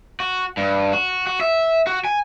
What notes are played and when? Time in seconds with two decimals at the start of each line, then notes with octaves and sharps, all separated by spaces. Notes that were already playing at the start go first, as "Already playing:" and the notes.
0.20 F#4
0.57 G2
0.93 F#4
1.27 F#4
1.41 E5
1.87 F#4
2.05 G#5